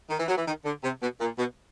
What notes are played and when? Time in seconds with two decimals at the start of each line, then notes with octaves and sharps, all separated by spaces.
0.10 D#3
0.19 E3
0.28 F#3
0.37 E3
0.47 D#3
0.65 D3
0.83 C3
1.02 B2
1.20 A#2
1.39 B2